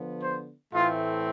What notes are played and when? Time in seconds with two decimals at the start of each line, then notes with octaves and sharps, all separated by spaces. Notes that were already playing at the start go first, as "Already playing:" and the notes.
Already playing: D3 F3 B3
0.22 C5
0.73 A2 E3 A3 C4 F4